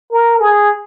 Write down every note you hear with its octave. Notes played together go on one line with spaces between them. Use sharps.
A#4
G#4